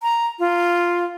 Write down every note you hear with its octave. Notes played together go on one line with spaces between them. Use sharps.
A#5
F4